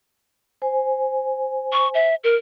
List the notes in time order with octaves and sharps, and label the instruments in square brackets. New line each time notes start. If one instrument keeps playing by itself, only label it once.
[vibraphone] C5 G#5
[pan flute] C#6
E5
A#4